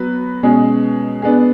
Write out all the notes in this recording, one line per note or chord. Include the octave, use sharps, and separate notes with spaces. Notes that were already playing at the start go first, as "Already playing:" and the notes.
Already playing: F#3 B3 F#4 B4
B2 G#3 C#4 G#4
B3 D4 G#4